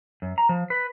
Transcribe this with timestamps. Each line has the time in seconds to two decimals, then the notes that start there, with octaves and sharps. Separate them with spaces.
0.22 F#2
0.38 A#5
0.49 F3
0.70 B4